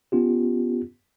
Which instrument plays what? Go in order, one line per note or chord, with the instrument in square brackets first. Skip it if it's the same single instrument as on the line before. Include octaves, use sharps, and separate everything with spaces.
[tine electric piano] B3 C#4 F4 G4